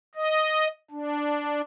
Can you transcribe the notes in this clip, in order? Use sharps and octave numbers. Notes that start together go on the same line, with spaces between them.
D#5
D4